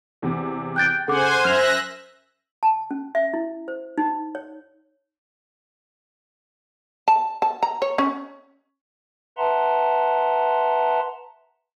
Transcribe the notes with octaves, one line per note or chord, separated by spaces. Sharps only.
E2 C3
G5 F#6 G6 A6
C#3 A4 C5 F#5 G#5 D6
F#2 E5 F6 F#6 A#6 F7
A5
C#4
E5
E4
C5
D#4
C#5
A5
A5
A#5
C#5
C#4
B4 E5 F#5 A5 A#5 C6